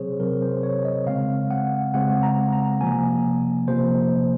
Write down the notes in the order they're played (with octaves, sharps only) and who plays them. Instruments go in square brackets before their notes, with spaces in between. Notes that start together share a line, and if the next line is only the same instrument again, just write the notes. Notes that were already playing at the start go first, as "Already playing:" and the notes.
Already playing: [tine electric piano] C3 F#3 C4 G#4 C5 C#5
C3 F#3 C4 A#4
C5
C#5
D#5
C#3 G#3 C4 F5
F#5
C#3 G#3 C4 F#5
A#5
A#5
C3 F3 A#3 G#5
C3 F3 A#3 C5